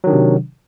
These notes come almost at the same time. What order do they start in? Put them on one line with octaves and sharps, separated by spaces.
F#3 D#3 D4 C3